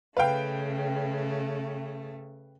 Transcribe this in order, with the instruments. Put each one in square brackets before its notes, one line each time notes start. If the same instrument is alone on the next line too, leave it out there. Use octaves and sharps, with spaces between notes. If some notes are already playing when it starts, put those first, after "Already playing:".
[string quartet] C#3 A3 [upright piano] B4 F5 G5